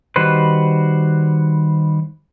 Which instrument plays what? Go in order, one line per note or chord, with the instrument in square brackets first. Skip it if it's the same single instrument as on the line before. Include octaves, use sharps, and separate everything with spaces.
[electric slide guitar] D#3 G3 F#4 B4 C5